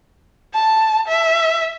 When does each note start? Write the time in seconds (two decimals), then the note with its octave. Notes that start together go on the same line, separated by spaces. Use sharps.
0.54 A5
1.08 E5